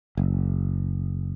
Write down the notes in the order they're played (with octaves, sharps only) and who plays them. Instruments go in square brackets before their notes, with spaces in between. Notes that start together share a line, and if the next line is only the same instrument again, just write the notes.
[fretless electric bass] F#1